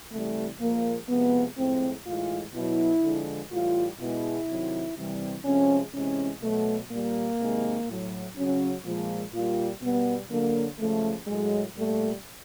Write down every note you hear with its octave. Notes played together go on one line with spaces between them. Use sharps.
C3 E3 G3 A3
A#2 F3 G#3 A#3
C3 F3 G#3 B3
A2 F3 G#3 C4
A2 E3 G#3 F4
B2 F#3 E4
D3 F3 G#3
A2 E3 G3 F4
B2 G#3 E4
C3 D#3 F#3
C3 E3 G3
C3 F3 G#3 C#4
C3 E3 G#3 C#4
B2 F#3 A3
A#2 G3 A#3
C3 D#3 G#3
A2 F#3
C#3 F#3 C#4
A#2 F3 G#3
A#2 G3 F4
B2 G3 B3
D3 F#3 A#3
C#3 F3 G#3 A3
A2 F#3 G#3
A#2 G3 A3